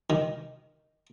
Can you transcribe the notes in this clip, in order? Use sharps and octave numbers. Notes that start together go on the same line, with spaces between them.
D#3